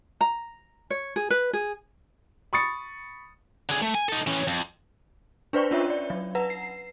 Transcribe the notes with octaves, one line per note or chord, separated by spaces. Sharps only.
A#5
C#5
G#4
B4
G#4
B5 C#6 D#6 A6 C#7
D3 G#4
A3
G#5
D#4 A4
E3 C#4
F2
D4 B4 C5 D5 G5 C#6
C#4 D4 F4 C#5 E5
D5
F#3
B4 F#5 A#5
C7